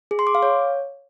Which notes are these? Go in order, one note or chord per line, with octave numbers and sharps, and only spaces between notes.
G#4
C6
D6
F5
C#5